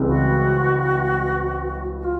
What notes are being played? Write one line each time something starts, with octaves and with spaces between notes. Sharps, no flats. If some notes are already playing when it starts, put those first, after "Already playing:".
Already playing: C#2 C#3 E3 G3 C4
F#4
F#4
F4